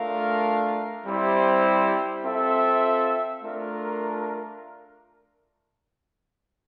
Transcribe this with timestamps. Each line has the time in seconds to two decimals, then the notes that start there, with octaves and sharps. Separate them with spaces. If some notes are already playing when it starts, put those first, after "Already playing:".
Already playing: A3 D4 F4 A#4 F5
1.06 G3 C4 E4 G4 C5
2.24 C4 F4 A4 E5
3.43 A3 D4 F4 A#4